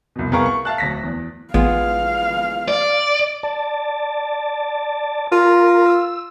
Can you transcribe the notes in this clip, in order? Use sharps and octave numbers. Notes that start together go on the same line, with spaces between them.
C2 B2
C2 B3 G#4 A#4 F5 C#6
C#6
E5 F5 A5 F#6
D1 A#6 B6
E2
A1 G#3 B3 F4 F5
D5
D5 A5
F4 A#4
E6